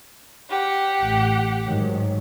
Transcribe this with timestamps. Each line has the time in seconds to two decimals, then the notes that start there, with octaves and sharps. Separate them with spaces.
0.49 G4 F#5
1.01 A1
1.65 G#2 D#3 F#3